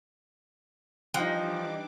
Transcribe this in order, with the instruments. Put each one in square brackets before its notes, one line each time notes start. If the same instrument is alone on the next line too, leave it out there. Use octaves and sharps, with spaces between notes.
[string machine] E3 D4 D6 [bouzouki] F3 [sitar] G3 D#4 [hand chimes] G5 F#6